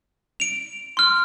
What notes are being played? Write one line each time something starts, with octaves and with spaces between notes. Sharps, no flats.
D7 F7
C6 F6